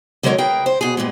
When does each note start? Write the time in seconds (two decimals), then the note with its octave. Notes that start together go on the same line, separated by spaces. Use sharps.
0.23 D3 F#3 G#3 B3 A#4 C#5
0.38 G#4 A#4 B4 G5
0.66 C5
0.81 B2 G#4
0.97 G2 A#2 G#3